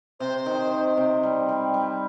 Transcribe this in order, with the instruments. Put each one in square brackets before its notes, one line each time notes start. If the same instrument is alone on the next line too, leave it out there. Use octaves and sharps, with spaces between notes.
[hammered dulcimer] C3 [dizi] C5
[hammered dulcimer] D#3
D#3
C3
G3
G3
G3